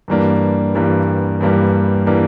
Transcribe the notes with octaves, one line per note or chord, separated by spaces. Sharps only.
G2 E3 G3 A#3 D4
G2 E3 G3 A#3 D4
G2 E3 G3 A#3 D4
E3 G3 A#3 D4